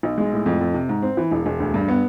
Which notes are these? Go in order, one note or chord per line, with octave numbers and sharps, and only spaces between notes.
B1
G#3
A2
F2
F2
C3
G#2
C4
E3
E1
E1
D2
G2
B3